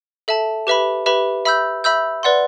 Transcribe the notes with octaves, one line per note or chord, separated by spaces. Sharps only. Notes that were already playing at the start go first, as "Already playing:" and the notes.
A4 E5 A5
G4 B4 E5 B5
G4 B4 E5 B5
E5 B5 E6 G6
E5 B5 E6 G6
B4 D5 F#5 C6